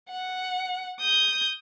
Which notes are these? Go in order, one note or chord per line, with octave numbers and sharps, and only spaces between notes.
F#5
D#6 G6